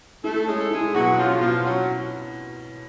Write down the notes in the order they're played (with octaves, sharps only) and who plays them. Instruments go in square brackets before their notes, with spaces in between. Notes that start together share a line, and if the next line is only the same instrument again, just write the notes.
[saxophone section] A3 A4 [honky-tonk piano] E4
[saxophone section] G#3 G#4 [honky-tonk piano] C#4
[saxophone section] A4
[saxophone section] G#3 G#4 [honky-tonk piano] E4
[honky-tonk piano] B2 [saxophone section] F#3 F#4
[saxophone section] F3 F4 [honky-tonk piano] C#4
[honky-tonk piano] B2 [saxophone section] F3 F4
[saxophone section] F#3 F#4 [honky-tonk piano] C#4